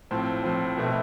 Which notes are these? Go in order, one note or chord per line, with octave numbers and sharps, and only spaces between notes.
A2 F3 C4
A2 F3 C4
B2 A3 C4 E4